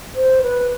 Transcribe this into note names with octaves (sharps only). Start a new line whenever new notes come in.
C5
B4